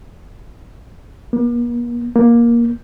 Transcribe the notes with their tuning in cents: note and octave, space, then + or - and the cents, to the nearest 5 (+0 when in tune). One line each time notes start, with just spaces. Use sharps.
A#3 +45
A#3 +15